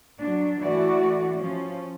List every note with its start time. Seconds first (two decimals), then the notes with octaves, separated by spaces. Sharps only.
0.20 F#3 D4
0.64 E3 A3 F#4 D5
1.36 F3 C#4